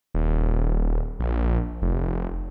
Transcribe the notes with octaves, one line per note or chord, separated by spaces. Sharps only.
D#1
A#1
F1